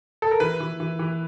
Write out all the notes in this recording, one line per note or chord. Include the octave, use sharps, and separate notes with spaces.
A4
A#4
E3 B4
E3
E3
E3